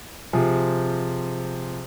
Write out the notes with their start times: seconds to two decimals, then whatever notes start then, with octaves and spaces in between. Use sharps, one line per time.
0.33 C3 F3 G#4